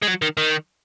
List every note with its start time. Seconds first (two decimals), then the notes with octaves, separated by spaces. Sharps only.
0.02 G#3
0.07 F#3
0.22 D#3
0.37 D#3